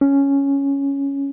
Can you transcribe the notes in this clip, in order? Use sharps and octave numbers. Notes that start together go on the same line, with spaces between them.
C#4